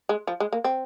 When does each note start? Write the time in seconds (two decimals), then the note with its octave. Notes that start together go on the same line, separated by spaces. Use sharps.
0.09 G#3
0.27 F3
0.40 G#3
0.53 A#3
0.64 C4